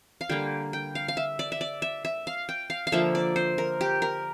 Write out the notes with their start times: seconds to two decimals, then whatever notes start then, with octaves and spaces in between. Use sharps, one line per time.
0.21 F5
0.29 D3 G3 A#3 G5
0.73 G5
0.95 F5
1.08 F5
1.17 E5
1.39 D5
1.52 E5
1.61 D5
1.82 E5
2.05 E5
2.27 F5
2.49 G5
2.70 F5
2.87 F5
2.92 D3 F3 A#3 E5
3.15 D5
3.36 C5
3.58 A#4
3.81 G4
4.02 A#4